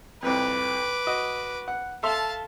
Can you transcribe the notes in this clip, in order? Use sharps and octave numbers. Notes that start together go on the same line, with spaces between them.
C2 F2 B4 D6
F#4 D#5
F#5
A4 E5 F5 A5 C6